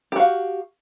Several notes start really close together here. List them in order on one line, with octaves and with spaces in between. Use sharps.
G4 F#4 F5